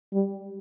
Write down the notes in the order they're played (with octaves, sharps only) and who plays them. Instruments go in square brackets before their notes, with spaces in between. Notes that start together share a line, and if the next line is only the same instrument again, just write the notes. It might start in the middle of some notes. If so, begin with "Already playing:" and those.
[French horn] G3